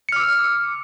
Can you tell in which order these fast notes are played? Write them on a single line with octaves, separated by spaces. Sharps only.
C#7 F6 D6 E6